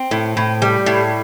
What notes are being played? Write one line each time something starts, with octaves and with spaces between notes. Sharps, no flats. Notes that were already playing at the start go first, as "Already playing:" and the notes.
Already playing: C4
A2
A2
G3
A2